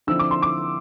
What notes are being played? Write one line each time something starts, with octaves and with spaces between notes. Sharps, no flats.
D3 F3 C4 E4 E6
D6
C6
D6